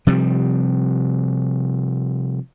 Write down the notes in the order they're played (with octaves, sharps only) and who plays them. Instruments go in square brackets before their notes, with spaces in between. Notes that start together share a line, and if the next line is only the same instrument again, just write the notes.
[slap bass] C3 F3 G3